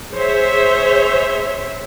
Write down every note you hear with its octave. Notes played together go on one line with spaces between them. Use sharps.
G#4 C5 C#5 E5